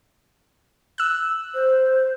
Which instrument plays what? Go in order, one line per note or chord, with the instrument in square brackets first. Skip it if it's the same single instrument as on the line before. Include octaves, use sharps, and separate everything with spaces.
[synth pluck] E6 F#6
[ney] C5